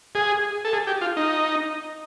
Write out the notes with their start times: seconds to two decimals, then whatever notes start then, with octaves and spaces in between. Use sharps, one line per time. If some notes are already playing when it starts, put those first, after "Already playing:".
0.15 G#4
0.65 A4
0.73 G#4
0.87 G4
1.01 F4
1.17 D#4